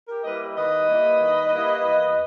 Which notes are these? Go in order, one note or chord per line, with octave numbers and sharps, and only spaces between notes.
G4 A#4
G3 A#3 E4 B4 D#5
D#3 B4 D#5
G3 A#3 E4
D#3
G3 A#3 E4
E2